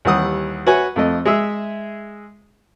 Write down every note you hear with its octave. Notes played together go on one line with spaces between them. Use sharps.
D#2 E3 G3 F#5 D#6
F#4 B4 C#5 E5 G#5
F2 A3 D#5
G#3 G#4 E5 E6